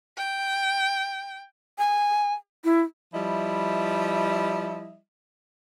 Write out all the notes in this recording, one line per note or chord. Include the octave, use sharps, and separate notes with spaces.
G5
G#5
E4
F3 G3 E4 D#5 E5